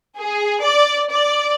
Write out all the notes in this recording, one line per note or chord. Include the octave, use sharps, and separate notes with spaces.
G#4
D5
D5